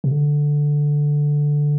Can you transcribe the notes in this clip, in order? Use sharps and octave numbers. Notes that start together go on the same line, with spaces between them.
C3
D3